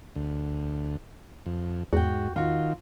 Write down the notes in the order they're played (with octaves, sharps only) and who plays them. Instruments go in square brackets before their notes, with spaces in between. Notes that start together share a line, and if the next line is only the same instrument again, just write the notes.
[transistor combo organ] D2
F2
[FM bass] E2 [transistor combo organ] G#2 [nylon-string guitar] F#4 G5
[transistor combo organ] D#3 [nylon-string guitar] F4 F#4